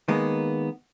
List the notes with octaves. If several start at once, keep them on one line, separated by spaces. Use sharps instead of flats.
D#3 G#3 A#3 B3